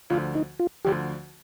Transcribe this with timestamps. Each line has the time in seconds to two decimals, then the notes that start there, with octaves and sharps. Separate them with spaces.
0.10 D2 D3 F3 F4
0.35 D#4
0.60 F4
0.85 D2 D3 F3 G4